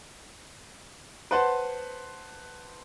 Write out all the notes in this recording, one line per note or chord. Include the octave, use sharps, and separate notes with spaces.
B4 C5 F#5 A5 C6